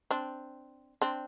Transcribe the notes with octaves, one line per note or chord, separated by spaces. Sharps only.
C4 D4
C4 D4